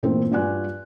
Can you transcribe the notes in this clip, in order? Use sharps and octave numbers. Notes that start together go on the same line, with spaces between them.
A#2 E3 A3 A#3 C4
G2 F4 F#4 D5 G#5 F#6